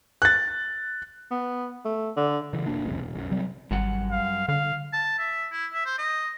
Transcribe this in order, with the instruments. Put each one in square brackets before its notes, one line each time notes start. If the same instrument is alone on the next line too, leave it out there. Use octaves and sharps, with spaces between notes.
[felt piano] F#6 A6
[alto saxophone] B3
A3
D3
[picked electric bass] C#3 E3
F1 B2 A#3 D4
F#1 C2 F2 A2
E1
B1 F#2
C3 F#3 G3 C4
[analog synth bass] G#1 [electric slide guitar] F#2 G3 F#5
[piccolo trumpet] F5
[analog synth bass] D3 [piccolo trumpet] F5
[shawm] A5
E5
E4
E5
C5
D#5